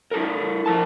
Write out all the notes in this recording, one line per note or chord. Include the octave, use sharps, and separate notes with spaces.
E4 A4 A#4
F3 A#4 A5